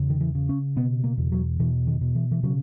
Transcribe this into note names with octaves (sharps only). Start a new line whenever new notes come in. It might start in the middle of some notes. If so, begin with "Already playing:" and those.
Already playing: E2 C#3
D#3
E3
C#3
C#4
B2 B3
A#3
E2
F#3
B2 E3
D#3
B2
E3
E3
C#3 F#3